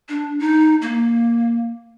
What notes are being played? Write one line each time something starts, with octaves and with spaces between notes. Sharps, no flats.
D4
D#4
A#3